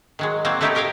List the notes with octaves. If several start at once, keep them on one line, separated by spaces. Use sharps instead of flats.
D#3 F#3 G#3
F#3 A#3 C4
F#3 A3 D#4 E4 G4
G4 A#4 C#5 F5 G5